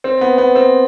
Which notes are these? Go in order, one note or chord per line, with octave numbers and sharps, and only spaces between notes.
C4
B3
B3
C4